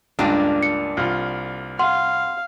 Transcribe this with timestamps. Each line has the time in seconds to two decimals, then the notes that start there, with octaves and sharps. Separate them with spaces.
0.19 C#2 G2 A#3 D4
0.63 C#7
0.97 C2 F4
1.79 F5 F#5 C6